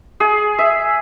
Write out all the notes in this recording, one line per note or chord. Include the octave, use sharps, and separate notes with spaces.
G#4
E5